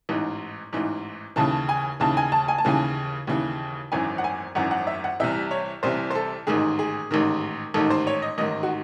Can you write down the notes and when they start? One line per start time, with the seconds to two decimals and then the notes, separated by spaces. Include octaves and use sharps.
0.09 A1 G#2 E3
0.73 A1 G#2 E3
1.36 D#2 C#3 E3 A5
1.69 G#5
2.00 D#2 C#3 E3 A5
2.17 G#5
2.32 A5
2.48 G#5
2.58 A5
2.65 D#2 C#3 E3 G#5
3.27 D#2 C#3 E3
3.92 G#1 F#2 E3 G#5
4.18 F#5
4.24 G#5
4.55 G#1 F#2 E3 F#5
4.71 F#5
4.87 E5
5.04 F#5
5.20 C2 C3 E3 E5
5.51 C#5
5.83 C2 C3 E3 C5
6.10 C5
6.15 A4
6.47 A1 G#2 D#3 G#4
6.79 G#4
7.11 A1 G#2 D#3
7.74 A1 G#2 D#3 A4
7.90 C5
8.07 C#5
8.22 D#5
8.38 A1 G#2 D#3 D#5
8.63 F#4